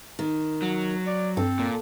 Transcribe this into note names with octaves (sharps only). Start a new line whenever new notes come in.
D#3
F#3
D5
G2 C4 A4
A#2